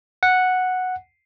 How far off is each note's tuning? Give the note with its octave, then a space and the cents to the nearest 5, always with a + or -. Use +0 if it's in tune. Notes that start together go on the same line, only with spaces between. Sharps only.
F#5 -5